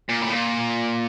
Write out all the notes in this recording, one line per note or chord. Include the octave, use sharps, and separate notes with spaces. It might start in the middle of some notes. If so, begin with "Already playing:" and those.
A#2
A2
A#2